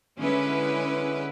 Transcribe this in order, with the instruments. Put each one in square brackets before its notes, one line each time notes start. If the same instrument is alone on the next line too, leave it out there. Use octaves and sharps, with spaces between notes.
[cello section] D3 G#3 C#4 E4 B4